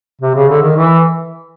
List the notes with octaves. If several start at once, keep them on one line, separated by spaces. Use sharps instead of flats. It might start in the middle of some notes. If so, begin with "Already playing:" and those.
C3
C#3
D3
D#3
E3